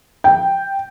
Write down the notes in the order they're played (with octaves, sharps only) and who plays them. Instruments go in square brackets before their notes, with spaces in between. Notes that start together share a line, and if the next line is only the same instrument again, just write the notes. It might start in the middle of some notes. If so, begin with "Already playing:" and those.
[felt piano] G5